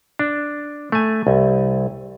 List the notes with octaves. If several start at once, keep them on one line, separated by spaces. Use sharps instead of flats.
D4
A3 G#5
C2